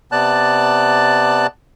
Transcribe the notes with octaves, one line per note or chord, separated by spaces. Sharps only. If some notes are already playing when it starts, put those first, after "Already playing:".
C3 B3 D5 A5 F#6